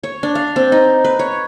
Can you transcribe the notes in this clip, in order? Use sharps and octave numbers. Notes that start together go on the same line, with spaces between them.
C#5
D4
F5
C4
D#4
B4
C#5